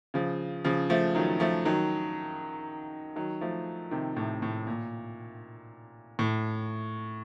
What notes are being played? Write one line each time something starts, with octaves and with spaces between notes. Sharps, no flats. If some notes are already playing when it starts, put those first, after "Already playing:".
C#3 F3
C#3 F3
F3 A3
D#3 F#3
F3 A3
D#3 F#3
D#3 F#3
F3 A3
C3 D#3
A2 C3
A2
A#2
A2